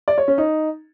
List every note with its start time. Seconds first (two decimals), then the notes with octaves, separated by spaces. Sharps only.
0.08 D5
0.18 C#5
0.28 C#4
0.38 D#4